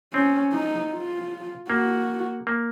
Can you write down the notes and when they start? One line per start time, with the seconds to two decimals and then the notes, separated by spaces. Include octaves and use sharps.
0.14 C4 C#4
0.53 D#4
0.92 F4
1.69 A#3 F#4
2.47 A#3